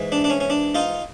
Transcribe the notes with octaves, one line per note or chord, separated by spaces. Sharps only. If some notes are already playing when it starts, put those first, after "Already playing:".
Already playing: G#2 E3
D4
D4
C#4
C#4
D4
D#4 F4